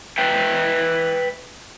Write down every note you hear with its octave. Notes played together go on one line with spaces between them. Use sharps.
B4 E5 G5